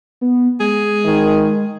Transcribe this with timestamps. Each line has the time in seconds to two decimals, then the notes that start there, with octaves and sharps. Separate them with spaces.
0.21 B3
0.60 G#3 G#4
1.05 D#3